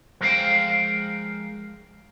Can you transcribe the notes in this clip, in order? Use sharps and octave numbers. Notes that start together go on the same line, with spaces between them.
F3 G#3 A#4 C5 F5 G5